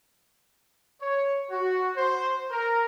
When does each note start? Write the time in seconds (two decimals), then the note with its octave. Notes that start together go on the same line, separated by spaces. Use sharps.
1.02 C#5
1.51 F#4
1.97 C5
2.52 A#4